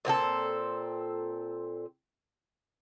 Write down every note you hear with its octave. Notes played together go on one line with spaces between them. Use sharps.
A#2 C4 G4 A4